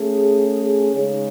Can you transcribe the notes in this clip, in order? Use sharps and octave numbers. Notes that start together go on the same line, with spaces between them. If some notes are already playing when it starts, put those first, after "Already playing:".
Already playing: A3 C#4 G#4
C#3 G#3 D#4 G#4 C#5